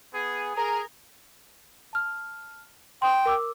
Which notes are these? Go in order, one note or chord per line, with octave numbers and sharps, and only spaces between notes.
B3 G#4
G#4 A#4
A5 F6
G5 C6 D#6
A#4 D6 E6